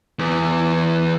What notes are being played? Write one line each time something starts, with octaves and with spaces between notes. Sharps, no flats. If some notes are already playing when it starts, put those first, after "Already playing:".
E2